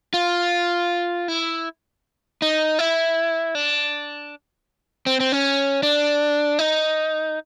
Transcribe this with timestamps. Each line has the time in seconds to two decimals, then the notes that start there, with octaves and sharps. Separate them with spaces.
0.14 F4
1.28 E4
2.42 D#4
2.79 E4
3.55 D4
5.06 C4
5.20 C4
5.32 C#4
5.83 D4
6.59 D#4